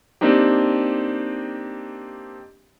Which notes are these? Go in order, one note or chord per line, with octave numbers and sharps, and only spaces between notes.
A#3 C4 D4 D#4 G4